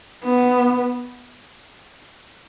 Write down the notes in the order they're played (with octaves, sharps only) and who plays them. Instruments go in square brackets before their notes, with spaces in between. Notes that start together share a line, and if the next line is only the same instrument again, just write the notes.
[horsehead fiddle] B3